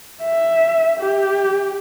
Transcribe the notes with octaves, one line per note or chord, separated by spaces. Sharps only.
E5
G4